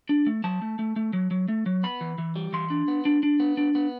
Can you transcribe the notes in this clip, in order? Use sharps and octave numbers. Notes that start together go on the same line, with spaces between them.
D4
A3
F#3 A5
A3
A3
A3
F#3
F#3
A3
F#3
B3 B5
E3
E3
G3
E3 C6
D4
B3
D4
D4
B3
D4
B3